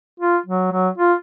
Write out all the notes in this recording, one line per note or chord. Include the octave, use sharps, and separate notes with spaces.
F4
F#3
F#3
F4